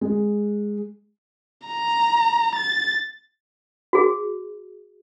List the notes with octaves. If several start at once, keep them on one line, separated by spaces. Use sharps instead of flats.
G#3
A#5
A6
F#4 G#4